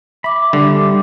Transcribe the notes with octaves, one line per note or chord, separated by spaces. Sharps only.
E5 B5 D6
D3 G3